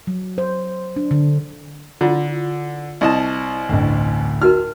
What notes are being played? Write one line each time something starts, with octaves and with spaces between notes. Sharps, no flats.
F#3
C5
D4
D3
D3 E4 F4
C2 D#5 A5
A1 D2
D#4 F#4 A#4 F6